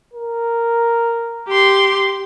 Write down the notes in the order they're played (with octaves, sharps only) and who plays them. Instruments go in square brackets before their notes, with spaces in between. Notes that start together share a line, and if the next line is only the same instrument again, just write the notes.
[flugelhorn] A#4
[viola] G4 C6